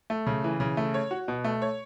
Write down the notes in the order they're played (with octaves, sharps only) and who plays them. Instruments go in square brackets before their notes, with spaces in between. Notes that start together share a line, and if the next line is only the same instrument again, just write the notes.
[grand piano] A3
C#3
E3
C#3
A3
C#5
F#4
B2
A3
C#5